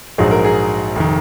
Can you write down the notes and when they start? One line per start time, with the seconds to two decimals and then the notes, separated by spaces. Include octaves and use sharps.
0.18 A#1 G#2 F#3 G#4
0.31 A#4
0.45 G#4
0.96 F1 D#3